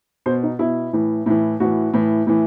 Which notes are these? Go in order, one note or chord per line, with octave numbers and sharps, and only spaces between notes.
B2 C5
D#4
B2 E4
A2 E3
A2 E3
A2 E3 F#4
A2 E3
A2 E3